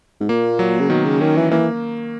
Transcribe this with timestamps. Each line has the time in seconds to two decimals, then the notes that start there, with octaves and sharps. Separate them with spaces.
0.21 G#2
0.29 A#2 A#3
0.59 F#3
0.81 C#3
0.90 B2 D#3
1.05 C#3
1.21 D#3 C#4
1.37 E3
1.51 E3 A#3